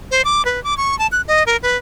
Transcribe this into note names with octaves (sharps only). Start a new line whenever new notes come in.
C5
D6
B4
D6
C#6
A5
F#6
D#5
A#4
B4